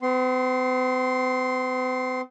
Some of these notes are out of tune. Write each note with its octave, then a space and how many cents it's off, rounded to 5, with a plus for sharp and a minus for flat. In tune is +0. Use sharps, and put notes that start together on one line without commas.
C4 -45 C6 +0